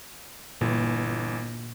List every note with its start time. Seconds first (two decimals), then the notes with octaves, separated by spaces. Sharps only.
0.61 G1 A#2 E3